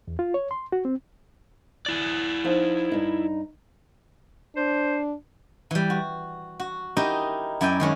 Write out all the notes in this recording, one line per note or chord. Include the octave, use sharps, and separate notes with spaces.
E2
F4
C#5
C6
F#4
C4
E4 D5
F3 D#4 A5
G2 D#4
D4 C5
E3 G3
F#4
F#4
D#4 E4 G4 A#4 D#5
F#2 E4 D5 G5 G#5
D#3 G#3 C#4